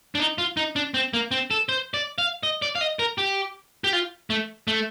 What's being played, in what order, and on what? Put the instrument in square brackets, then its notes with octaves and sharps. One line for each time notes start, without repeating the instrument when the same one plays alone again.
[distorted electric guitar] D4
D#4
F4
D#4
D4
C4
A#3
C4
A4
C5
D5
F5
D#5
D5
F5
D#5
A#4
G4
G4
F4
A3
A3